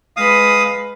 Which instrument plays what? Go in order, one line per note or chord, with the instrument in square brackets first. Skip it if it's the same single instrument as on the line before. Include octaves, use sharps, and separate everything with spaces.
[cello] G#3 B4 [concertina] F5 D#6